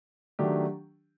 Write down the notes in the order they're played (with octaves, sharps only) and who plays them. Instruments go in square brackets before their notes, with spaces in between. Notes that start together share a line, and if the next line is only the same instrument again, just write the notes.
[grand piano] D#3 F#3 A3 D4 G4